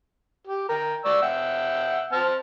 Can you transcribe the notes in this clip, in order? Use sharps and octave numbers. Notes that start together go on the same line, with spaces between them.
G4
A#4 G5
D5 C#6 E6
E5 F#5 G5
C4 A5 F6